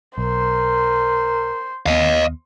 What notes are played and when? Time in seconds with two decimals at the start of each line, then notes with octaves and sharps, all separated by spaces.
0.18 B1 A#4 C5
1.86 D#2 B3 D#5 F5